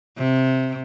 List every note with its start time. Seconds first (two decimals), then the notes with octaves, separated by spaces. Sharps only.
0.18 C3